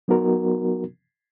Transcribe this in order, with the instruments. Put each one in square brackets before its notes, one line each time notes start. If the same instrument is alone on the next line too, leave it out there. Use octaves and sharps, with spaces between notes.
[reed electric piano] F#3 B3 D#4 F#4 A#4